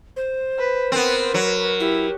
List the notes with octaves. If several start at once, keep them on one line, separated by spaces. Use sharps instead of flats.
C5
B4
B3 C4 A#4 B4
F#3
E4 G4